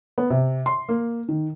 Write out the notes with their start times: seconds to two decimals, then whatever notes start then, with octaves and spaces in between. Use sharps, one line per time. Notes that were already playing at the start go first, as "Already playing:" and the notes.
0.18 B3
0.30 C3
0.66 C6
0.89 A#3
1.28 D#3